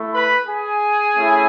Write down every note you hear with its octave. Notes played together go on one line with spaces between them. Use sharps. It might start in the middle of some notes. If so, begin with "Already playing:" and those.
Already playing: A3 E4
B4 B5
G#4 G#5
A3 C#4 E4